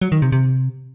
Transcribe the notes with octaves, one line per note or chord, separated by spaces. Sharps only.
F#3
D#3
C3
C3